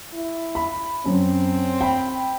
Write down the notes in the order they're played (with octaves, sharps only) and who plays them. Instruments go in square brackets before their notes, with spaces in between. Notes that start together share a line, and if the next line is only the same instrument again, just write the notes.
[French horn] E4
[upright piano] B5
[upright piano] F#2 [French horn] C4
[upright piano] G5 B5